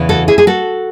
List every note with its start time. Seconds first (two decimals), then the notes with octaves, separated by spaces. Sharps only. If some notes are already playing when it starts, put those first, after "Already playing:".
Already playing: E2 C#3 E3
0.09 F#4 A4
0.28 E4 G#4
0.38 G#4
0.47 F#4 A4